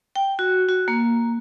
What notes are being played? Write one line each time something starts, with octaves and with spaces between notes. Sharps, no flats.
G5
F#4
F#4
A#3